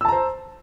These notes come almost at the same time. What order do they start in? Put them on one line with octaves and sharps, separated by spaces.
E6 A5 A#5 C5